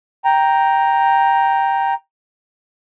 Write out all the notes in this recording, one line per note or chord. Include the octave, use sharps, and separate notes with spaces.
G5 A#5